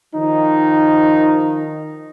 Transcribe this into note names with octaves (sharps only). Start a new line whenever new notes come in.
D#3 F3 D#4